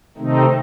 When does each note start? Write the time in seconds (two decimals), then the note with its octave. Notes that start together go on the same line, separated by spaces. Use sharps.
0.17 C3 D#3 A3 C4 D#4